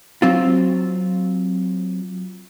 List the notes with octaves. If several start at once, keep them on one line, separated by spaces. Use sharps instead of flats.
F#3 C4 F4